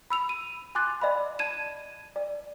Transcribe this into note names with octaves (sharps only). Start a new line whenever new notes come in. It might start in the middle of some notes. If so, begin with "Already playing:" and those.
B5 E6 F7
D#7
G#5 C6 D6 F#6 A6
D5 D#5 F5 B5
A5 G#6 D#7 E7
D5